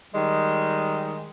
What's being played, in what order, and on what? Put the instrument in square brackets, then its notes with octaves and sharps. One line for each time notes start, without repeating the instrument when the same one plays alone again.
[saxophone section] D#3 G3 G#3